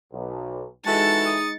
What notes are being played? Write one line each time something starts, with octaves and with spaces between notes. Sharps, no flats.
B1
E3 G#3 D#4 F#4 A4 A5 A6 C#7
D#6